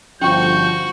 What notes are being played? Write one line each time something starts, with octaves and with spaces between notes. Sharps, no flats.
G1 F3 C#4 F#4 G5 C#6 G6